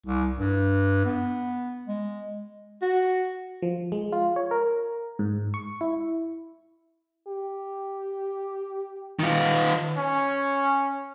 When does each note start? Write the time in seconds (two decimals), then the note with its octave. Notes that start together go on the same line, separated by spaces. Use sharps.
0.06 C2
0.38 G2
1.05 B3
1.88 G#3
2.82 F#4
3.62 F3
3.92 G#3
4.12 F4
4.36 C#5
4.51 A#4
5.19 G#2
5.54 C#6
5.81 E4
7.28 G4
9.19 D#3 F4
9.97 C#4